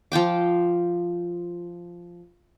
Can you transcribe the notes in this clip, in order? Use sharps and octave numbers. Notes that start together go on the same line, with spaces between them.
F3 F4 G5 D6